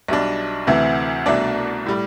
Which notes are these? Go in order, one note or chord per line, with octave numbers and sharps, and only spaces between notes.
B1 B2 G3 D4 E5
D2 C3 E3 A3
C2 B2 A3 D4 D5
A2 G3